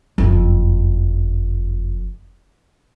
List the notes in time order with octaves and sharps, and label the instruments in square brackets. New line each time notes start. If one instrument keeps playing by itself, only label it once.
[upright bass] F#1 F2